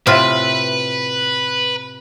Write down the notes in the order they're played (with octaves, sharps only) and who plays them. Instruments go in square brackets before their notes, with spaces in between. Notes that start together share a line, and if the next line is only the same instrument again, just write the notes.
[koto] A2 F4 E5 [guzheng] C3 [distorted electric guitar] B4